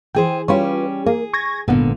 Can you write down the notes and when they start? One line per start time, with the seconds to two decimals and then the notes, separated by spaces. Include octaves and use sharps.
0.15 E3 G#4 C5 G5
0.48 G3 C#4 F4 G4 B4 C#5
1.06 A#3 G#4
1.33 C#6 G#6 A#6
1.68 G#1 A#2 D3 B3